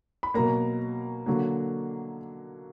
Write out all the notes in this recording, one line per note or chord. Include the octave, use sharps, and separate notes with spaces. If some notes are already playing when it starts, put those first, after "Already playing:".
B5
B2 F#3 A#3 A#4 A#5
D3 F#3 A#3